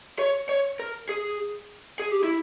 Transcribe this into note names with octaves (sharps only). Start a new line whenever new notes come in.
C#5
C#5
A#4
G#4
G#4
G4
E4